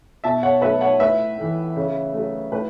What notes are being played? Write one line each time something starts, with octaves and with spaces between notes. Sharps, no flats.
B2 E5 A5
C#5 F#5
F#3 A3 B4 E5
C#5 F#5
A2 B4 E5
E3 A3
C#3
F#3 A3
A2 B4